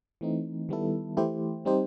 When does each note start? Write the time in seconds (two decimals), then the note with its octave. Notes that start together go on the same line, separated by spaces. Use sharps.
0.21 E3 A3 C4 D#4
0.69 D#3 G3 B3 E4 A4
1.17 E3 A3 E4 G4 C5
1.65 G3 C4 D#4 G4 C5